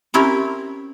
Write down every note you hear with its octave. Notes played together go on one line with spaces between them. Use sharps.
C4 C#4 E4 G4 A#4